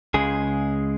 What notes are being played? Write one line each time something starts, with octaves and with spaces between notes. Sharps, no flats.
C#2 C#3 G#3 G#4